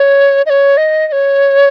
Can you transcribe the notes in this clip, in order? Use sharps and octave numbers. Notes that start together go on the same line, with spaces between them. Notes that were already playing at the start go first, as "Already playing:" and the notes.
Already playing: C#5
D#5
C#5
D#5
D#5
C#5